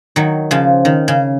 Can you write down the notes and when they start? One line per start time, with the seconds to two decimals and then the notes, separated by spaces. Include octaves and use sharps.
0.16 D#3 F#3
0.51 C#3 F3
0.85 D#3
1.08 C#3